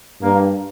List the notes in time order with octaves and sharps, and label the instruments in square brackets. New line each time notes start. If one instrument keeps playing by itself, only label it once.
[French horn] G2 [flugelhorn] A#3